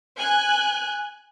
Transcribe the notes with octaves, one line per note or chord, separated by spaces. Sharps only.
G#5 F#6